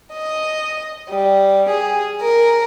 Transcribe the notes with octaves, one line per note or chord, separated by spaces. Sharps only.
D#5
G3
G#4
A#4